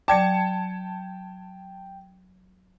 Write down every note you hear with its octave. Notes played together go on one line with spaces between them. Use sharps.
F#3 D5 G5 A5 D6 G#6 C#7